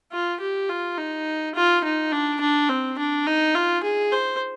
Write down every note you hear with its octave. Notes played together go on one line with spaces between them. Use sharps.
F4
G4
F4
D#4
F4
D#4
D4
D4
C4
D4
D#4
F4
G#4
C5